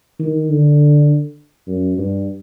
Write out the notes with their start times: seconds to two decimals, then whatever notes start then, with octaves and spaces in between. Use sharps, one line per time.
0.20 D#3
0.50 D3
1.67 F#2
1.98 G2